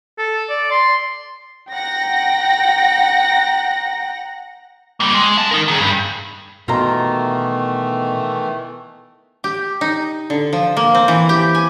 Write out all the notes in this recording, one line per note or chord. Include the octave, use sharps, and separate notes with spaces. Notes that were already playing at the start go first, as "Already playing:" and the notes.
A4
D5
C6
F#5 G5 A#5 A#6
G3 A#3
G#3
C#4 A5
D#4 A#4
D#3 G#4
G2
B2 D#3 E3 A3 F4 C5 A#5
G4
D#4
D3
F3
A#3
C4
E3
G4
G#5